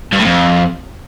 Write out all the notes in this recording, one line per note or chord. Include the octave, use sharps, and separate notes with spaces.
G2
A2
F2